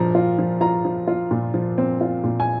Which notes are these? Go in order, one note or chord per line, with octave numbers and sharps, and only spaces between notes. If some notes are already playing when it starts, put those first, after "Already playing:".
Already playing: A#2 F3 A#5
F4
F3
F4 A#5
F3
F4
A#2
F3
C4
F4
A#2
G#5